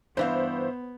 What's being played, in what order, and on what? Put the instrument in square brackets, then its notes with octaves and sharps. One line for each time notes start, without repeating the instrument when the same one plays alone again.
[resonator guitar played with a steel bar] G2 E3 F5 [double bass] B3 [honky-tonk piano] C5